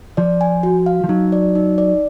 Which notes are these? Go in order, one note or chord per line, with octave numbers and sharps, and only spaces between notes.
F3 D5
G#5
F#4
F5
F3
F#3 D#4
D5
D#4
D5